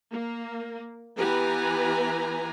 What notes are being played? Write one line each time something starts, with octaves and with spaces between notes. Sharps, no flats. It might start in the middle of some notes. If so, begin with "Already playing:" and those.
A#3
E3 B3 G4 B4 G#5 A#5